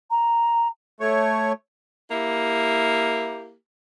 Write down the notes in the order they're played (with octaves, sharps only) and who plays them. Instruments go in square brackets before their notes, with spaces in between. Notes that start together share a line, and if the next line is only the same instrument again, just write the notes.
[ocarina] A#5
[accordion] A3 C#5
[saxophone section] A#3 E4 G4